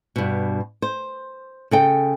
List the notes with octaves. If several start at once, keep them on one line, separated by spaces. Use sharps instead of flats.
G2 B2
C5
C#3 A4 G5